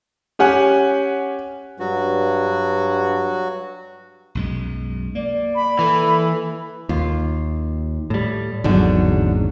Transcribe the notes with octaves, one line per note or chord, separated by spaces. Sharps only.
C#4 G4 F#5 G#5
G2 F#3 F#4
B1 F#2 G#3
A#3 D5
B5
E3 A4
D#2 F4
A2 G3
G#1 E2 G#2 D3 F#3